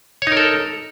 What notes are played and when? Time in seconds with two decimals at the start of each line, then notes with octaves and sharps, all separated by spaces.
0.22 C#5
0.27 D#4
0.32 A#4
0.37 A4